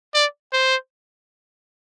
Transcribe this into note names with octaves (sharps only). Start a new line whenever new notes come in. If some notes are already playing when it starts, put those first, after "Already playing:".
D5
C5